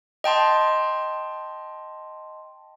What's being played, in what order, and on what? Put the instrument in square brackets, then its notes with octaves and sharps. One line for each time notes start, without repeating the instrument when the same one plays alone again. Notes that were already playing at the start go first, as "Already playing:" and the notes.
[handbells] D#5 G5 A5 C6